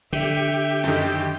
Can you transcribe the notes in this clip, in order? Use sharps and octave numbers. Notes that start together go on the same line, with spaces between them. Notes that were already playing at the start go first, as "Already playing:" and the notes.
D3 G4 E5
F#2 D#3